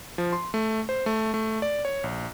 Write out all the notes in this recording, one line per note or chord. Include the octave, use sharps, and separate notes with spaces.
F3
C6
A3
C5
A3
A3
D5
C#5
A#1